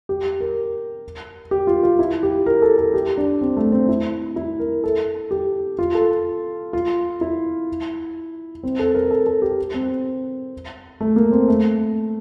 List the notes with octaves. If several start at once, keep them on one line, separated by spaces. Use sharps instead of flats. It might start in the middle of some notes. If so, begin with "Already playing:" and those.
G4
A#4
G4
F4
F4
E4
G4
A#4
A4
A4
G4
D4
C4
A3
C4
E4
E4
A#4
A4
G4
F4
A4
F4
E4
C4
A4
A#4
A4
A4
G4
C4
A3
A#3
C4
A3